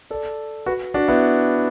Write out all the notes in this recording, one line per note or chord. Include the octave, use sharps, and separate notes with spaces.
A4 D5
F#4 B4
D4 F#4
B3 E4